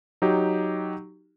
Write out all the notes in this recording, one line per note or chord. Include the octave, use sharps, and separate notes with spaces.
F#3 D#4 G4